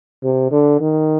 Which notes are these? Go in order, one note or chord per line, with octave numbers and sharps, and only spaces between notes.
C3
D3
D#3